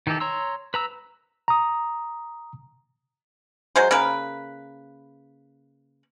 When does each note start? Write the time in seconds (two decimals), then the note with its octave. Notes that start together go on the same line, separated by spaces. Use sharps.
0.07 D#3 E3 D#4 G4 A4
0.20 C#5 A#5 C6 E6
0.74 B4 A#5 E6
1.48 A#5 D#6
3.76 F#3 G#3 C5
3.91 C#3 A#3 A#4 B4